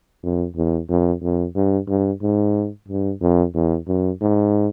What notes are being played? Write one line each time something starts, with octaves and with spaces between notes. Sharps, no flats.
F2
E2
F2
F2
G2
G2
G#2
G2
F2
E2
F#2
G#2